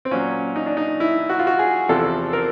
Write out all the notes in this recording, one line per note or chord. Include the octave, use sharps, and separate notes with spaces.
C4
A#2 F#3 C#4
D#4
D4
D#4
E4
F#4
F4
F#4
G#4
E2 C3 F3 A4
A#4